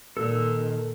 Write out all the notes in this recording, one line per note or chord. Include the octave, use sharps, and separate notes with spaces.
A#2 D#3 A4 E6